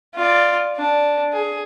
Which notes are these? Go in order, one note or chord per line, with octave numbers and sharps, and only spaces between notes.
F4 D5
D4
G#4